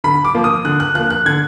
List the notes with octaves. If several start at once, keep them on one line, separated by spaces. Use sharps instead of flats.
D3 B5
D6
F3 A#3
D#6
D3 F#6
F#6
F3 A#3 F#6
F#6
D3 G#6